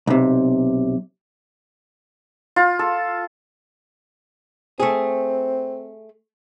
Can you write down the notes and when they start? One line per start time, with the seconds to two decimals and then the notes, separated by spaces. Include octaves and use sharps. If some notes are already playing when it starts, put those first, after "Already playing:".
0.07 B1 C3
2.56 F4
2.79 A4
4.80 A3 C4 G#4